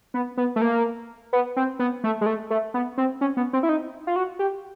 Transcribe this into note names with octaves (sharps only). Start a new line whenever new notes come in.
B3
B3
A3
A#3
B3
C4
B3
A3
G#3
A3
A3
B3
C4
C#4
B3
C4
E4
D#4
F4
F#4
G4